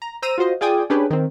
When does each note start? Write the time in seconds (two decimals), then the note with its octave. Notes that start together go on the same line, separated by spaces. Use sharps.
0.02 A#5
0.22 C5 A#5 E6 D#7
0.38 F4 F#4 C5 D#5
0.61 F4 G#4 D5 G5 G#5 D#6
0.90 C#4 D4 G4 G#4 B4
1.10 D#3 C4